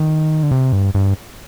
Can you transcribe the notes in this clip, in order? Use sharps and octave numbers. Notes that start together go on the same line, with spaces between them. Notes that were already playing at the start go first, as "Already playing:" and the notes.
Already playing: D#3
D3
C3
G2
G2